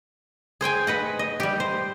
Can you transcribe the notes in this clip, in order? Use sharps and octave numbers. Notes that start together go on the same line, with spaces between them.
G#4 C5 G5 G#5
B4 D#5 F#5
D#5
G3 G4
C5